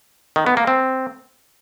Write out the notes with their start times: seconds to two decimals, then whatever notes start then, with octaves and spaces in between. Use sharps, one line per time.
0.36 D#3
0.46 B3
0.57 A#3
0.67 C4